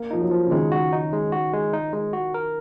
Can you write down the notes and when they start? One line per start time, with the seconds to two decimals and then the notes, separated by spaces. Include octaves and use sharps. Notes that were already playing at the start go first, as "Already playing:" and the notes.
Already playing: A#3
0.11 F3 D#4
0.21 F#3
0.31 F3
0.47 C#3
0.51 D#3 G#3
0.72 F#4
0.92 D#4
1.13 G#3
1.32 F#4
1.53 G#3
1.73 D#4
1.93 G#3
2.13 F#4
2.34 A#4